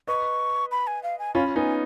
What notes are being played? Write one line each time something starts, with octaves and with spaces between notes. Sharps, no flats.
B4 D#5 C#6
B5
G#5
F5
G#5
C#4 F4 B5
B3 D#4 G#5